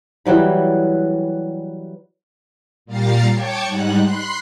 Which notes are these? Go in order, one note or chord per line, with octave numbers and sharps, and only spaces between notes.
E3 F#3 G3 B5
A#2 G3 F5 A#5 A6 C7
C#5 G5 A5 D6 G#6 C#7
G#2 G3 D#4 F#5 F#6
B5 C6 F#6 C7